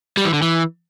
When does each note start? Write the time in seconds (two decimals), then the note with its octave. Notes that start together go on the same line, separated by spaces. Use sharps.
0.17 G3
0.25 E3
0.33 D3
0.42 E3